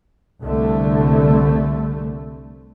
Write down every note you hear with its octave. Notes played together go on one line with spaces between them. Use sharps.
C2 D3 A3